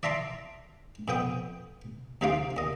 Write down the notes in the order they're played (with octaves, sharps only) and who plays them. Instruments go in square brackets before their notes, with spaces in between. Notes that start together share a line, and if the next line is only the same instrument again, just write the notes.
[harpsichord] D5 E5 A5 A#5 C6 D6
F2 B3 G5 D#6
D2 C3 D#4 F4 F5 D6
D#2 D#5